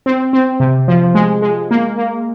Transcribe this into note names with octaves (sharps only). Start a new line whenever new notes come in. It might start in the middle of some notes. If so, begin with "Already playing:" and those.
C4
C4
C3
F3
G#3
G#3
A#3
A#3